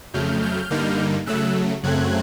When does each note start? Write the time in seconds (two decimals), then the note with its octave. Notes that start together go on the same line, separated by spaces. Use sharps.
0.14 F2 C#3 F#3 A3 F6 G6
0.42 F6 G6
0.70 G2 D3 G3 A#3 D#4
1.26 C#3 F#3 A3 E6 F#6
1.83 F#2 C#3 F#3 A3 C4 F#6 G#6